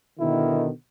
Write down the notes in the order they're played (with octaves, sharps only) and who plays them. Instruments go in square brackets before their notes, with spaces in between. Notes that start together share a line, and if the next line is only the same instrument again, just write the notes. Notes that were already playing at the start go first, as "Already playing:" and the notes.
[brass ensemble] B2 D3 D#3 [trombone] E4